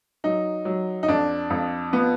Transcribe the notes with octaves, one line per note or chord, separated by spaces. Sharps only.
F#3 D#4
F#3
D#4
F2 D4
F2
F3 B3